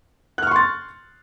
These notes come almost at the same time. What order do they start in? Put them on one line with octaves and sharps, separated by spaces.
F#6 F6 C#6 C6 A6